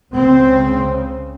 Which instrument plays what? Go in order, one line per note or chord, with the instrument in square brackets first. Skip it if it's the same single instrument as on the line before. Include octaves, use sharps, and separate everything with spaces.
[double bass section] C#2 C#3 C4